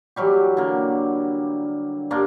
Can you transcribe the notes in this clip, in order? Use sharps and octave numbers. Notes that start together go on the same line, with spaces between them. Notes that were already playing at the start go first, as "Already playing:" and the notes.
E3 F#3 G3 G4
D3 A#3
G2 A#3 D4